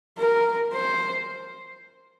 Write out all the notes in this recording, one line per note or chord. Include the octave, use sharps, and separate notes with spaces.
A#4
C5